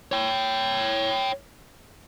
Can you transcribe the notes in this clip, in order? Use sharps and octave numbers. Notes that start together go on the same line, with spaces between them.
C#5 G5